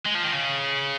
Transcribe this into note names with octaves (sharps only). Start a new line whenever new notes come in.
G#3
F3
D#3
C#3